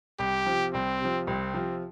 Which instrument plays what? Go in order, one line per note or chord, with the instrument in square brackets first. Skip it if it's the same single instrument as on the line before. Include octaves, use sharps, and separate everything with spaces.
[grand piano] C2 [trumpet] G4
[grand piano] C3 F3
[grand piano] C2 [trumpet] C4
[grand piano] C3 F3
[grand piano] C2 [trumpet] C4
[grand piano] C3 F3